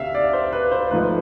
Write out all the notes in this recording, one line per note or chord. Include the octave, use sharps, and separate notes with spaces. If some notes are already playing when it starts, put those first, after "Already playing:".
Already playing: D2 C3 E5 F5
D5
C5
B4
C5
G#1 G#2 F3 A3 B4